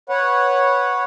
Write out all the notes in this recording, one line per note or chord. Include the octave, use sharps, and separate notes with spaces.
B4 C#5 F#5